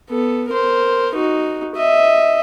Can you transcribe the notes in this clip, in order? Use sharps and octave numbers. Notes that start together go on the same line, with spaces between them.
B3 A4
A#4 C5
D#4 F#4
D#5 E5